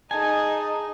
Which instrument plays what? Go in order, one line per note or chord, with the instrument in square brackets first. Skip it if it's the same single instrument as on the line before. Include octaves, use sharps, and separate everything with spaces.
[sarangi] D#4 [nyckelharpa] G#4 D#5 [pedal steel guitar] G#5 [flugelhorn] A5